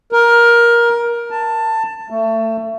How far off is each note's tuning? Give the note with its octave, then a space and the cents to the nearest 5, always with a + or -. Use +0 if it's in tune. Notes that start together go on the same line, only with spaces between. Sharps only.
A#4 +15
A5 +15
A3 +25